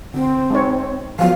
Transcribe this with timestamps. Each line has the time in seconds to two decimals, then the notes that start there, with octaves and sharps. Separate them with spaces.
0.14 D3 C4
0.50 G#3 D#4 C#5
1.19 F3 F#3 B3 F5